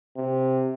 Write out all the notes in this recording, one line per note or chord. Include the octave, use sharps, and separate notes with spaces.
C3